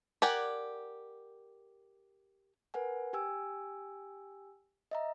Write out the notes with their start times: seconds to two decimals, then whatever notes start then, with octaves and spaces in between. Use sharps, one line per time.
0.22 G4 A#4 D5 F#5 G#5
2.74 A#4 B4 F#5 G#5
3.13 G4 G5 G#5 E6
4.91 D#5 E5 A#5